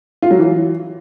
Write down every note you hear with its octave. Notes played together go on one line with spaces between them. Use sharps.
F4
F#3
E3